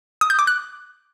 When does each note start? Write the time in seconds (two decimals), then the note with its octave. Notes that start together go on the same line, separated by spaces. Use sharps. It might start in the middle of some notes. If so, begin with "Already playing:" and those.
0.21 D#6
0.30 G6
0.39 D6
0.47 F#6